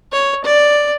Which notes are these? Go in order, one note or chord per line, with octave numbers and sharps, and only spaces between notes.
C#5
D5